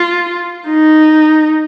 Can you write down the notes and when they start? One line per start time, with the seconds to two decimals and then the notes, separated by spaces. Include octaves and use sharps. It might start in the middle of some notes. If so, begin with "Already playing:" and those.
Already playing: F4
0.68 D#4